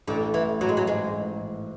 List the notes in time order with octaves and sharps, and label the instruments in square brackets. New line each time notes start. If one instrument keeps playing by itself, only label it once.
[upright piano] A1 [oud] D3
[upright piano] A1 [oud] E3
[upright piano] A1 [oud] F#3
[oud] G#3
F#3
[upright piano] G#2 [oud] G#3
[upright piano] A1
A1